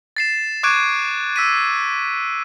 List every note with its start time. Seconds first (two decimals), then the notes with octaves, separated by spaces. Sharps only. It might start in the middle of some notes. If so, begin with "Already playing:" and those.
0.17 A6 C7 E7
0.63 C#6 D6 F#6 G#6 D7 D#7
1.36 E6 B6 D#7